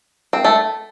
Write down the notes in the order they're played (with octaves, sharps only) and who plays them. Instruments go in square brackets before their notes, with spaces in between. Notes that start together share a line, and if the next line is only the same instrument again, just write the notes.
[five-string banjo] C4
A3